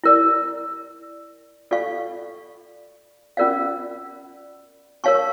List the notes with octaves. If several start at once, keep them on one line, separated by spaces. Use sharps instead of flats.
E4 A#4 D5
F4 A4 D5 F5 C#6
C#4 F4 A#4 D5 F5
A#4 C#5 F5 A5 C#6